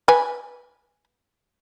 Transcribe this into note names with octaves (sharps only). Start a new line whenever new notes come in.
B4 G#5